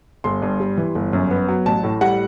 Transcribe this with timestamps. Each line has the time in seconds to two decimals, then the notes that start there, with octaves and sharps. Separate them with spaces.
0.24 G1 C6
0.42 G2
0.60 G3
0.77 E3
0.95 G1
1.13 F#2
1.31 B3
1.48 F#3
1.66 A1 A5
1.83 A2
2.01 G3 F#5